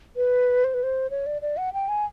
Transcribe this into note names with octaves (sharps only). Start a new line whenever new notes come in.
B4
C5
B4
C5
C#5
D5
D5
F#5
G5
G#5